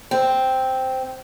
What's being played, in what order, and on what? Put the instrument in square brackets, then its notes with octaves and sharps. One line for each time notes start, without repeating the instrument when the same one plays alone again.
[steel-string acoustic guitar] C4